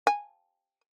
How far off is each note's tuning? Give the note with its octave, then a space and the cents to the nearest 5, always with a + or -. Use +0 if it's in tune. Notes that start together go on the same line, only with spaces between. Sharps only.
G#5 -10